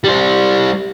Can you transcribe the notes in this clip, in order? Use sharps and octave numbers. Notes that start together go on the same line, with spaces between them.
G3 C5